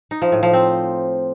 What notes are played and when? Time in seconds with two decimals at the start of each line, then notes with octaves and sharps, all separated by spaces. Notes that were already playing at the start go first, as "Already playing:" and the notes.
0.11 D#4
0.22 F3
0.32 A2
0.43 F3
0.53 C4